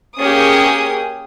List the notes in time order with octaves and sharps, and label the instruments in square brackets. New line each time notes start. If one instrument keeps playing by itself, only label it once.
[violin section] A#3 C#4 G4 G#4 D#6